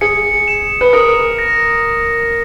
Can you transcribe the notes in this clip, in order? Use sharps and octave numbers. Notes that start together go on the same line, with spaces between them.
G#4 C#7
E7
B4
A#4 D#6
A#6